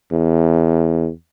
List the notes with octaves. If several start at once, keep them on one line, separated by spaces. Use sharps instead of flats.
E2